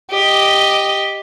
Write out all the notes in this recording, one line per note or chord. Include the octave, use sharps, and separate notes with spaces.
G4 D#5